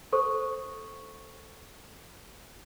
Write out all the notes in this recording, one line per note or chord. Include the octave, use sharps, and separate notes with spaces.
A4 C5 C#6